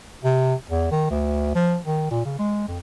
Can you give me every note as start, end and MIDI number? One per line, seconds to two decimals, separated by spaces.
0.24 0.54 48
0.70 0.88 40
0.91 1.06 51
1.10 1.55 38
1.55 1.77 53
1.84 2.07 51
2.11 2.22 46
2.25 2.37 49
2.39 2.67 56
2.68 2.78 41